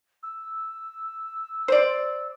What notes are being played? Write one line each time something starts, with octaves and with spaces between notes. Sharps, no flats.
E6
C5 D5